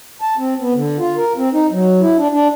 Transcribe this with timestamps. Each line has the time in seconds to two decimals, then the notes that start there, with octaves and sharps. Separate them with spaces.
0.21 A5
0.38 C4
0.60 B3
0.75 D3
0.99 F4
1.17 A#4
1.37 C4
1.53 D#4
1.71 F#3
2.01 E4
2.18 D4
2.32 D4